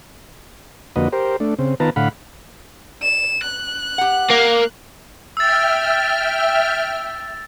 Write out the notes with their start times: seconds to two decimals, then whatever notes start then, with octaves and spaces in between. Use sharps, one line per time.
0.96 F2 D3 A#3 F#4 B4 D#5
1.13 G4 A#4 C5
1.40 A3 D4
1.59 C#3 C4
1.80 D#3 B3 F4 B4 A5 A#5
1.96 A2 D3 F5 F#5 B5
3.02 E7
3.43 F#6
3.98 G4 F#5
4.31 A#3
5.37 E5 G5 E6 F6 A6